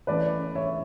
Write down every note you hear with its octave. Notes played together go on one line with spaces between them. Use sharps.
E3 A3 C#4 B4 D5
C#5 E5